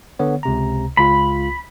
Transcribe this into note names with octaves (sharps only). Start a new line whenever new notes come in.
D3 B3 C#5
C#2 C3 A#5
C#2 F4 B5